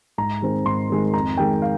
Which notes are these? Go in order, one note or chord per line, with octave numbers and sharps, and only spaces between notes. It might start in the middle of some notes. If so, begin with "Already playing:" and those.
G#2 A#5
D#3 G#3 C4
G#2 C6
D#3 G#3 C4
F2 A#5
D#3 G#3 G5
F5